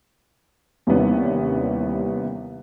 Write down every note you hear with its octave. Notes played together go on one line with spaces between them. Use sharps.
D#2 C3 E3 G3 B3 C#4